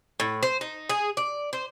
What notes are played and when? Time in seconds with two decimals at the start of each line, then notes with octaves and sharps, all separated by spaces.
0.20 A2
0.43 C5
0.61 D#4
0.90 G#4
1.17 D5
1.53 C5